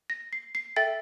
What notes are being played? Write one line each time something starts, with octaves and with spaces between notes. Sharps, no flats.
A#6
C7
C7
A4 E5 G5 A6